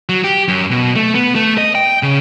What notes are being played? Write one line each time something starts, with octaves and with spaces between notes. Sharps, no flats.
F#3
G4
F#2
B2
A3
B3
A3
D#5
G5
C#3